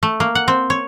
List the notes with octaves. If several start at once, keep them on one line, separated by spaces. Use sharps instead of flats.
A3
A#3
F#5
C4
C#5